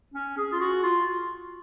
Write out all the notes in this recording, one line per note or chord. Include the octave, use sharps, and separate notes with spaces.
C#4
G#4
F4
F#4
F4